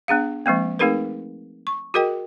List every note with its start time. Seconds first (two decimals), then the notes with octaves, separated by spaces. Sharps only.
0.08 B3 D4 G#4 F5
0.46 F3 G#3 A#3 C4
0.79 A3 C4 D#4 G#4 A#4 B4
1.67 C#6
1.94 F#4 G#4 A#4 D#5 G5